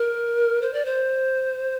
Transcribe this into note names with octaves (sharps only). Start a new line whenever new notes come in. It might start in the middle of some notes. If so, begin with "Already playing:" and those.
Already playing: A#4
C5
D5
C5